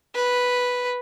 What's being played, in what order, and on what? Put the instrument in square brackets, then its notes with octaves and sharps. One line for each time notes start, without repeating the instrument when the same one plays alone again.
[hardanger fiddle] B4